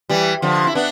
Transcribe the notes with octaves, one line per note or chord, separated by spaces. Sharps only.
E3 G3
D3 F3
E4
B3 D4